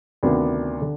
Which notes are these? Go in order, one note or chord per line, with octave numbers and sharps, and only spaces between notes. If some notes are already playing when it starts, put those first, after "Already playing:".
D2 C3 D#3 B3 D4
D3